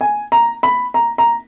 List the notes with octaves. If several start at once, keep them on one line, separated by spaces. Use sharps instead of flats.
G#5
A#5
B5
A#5
A#5